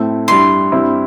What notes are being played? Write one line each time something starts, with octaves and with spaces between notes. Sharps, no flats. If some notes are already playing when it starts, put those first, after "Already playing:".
Already playing: A2 A3 C4 E4
G2 G3 E4 C6
G2 G3 C4 E4